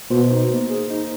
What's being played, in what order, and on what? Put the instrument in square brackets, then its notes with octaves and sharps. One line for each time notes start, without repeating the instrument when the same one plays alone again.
[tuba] B2 [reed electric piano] C5
[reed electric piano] D#4
A#3
G#4
D#4